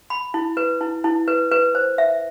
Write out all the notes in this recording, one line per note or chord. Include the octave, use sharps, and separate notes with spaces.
B5
E4
B4
E4
E4
B4
B4
C5
E5